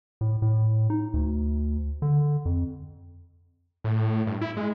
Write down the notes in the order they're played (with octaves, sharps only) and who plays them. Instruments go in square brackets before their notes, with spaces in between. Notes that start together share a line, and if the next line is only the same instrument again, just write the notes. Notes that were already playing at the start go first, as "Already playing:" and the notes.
[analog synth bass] A2
A2
D#4
D2
D3
F2
[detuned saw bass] A2
G2
E4
G#3